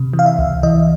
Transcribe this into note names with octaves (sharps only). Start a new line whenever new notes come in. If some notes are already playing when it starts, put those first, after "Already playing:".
Already playing: C3
E3
F5
E5
C#2
E3 D#5